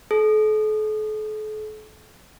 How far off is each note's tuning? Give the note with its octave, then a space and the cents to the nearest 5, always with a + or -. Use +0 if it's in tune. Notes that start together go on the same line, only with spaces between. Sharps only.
A4 -40